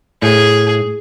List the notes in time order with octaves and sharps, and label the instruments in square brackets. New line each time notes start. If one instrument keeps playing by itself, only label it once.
[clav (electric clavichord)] A2 [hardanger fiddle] G#4